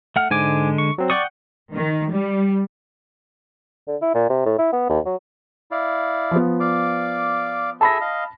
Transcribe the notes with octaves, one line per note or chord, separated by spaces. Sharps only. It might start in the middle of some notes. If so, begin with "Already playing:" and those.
A3 F#5 F6
G#2 D3 G#3 G#5 D6
C#6
F#3 C4
D5 F#5 G5 C#6 D#6
D#3
G3
D3
E4
A#2
C3
A2
E4
B3
D#2
F#3
E4 D5 F5
F3 B3
D5 F5 D6
G#4 A4 E5 A5 B5 A#6
D#5 F5